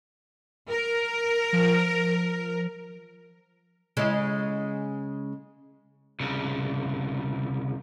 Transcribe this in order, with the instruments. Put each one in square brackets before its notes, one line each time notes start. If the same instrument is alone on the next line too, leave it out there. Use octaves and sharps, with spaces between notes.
[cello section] A#4
[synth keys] F3
[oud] C#3 G#3 E4
[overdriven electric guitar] C2 C#3